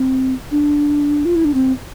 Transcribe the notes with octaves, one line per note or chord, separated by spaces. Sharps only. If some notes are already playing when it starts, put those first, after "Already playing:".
Already playing: C4
D4
F4
E4
D4
C4